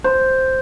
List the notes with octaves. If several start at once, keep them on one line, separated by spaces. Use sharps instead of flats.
C5